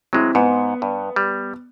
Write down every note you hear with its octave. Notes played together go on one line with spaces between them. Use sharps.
F#3 G#3 C4 E4
G#2 B3 C#7
G2
G3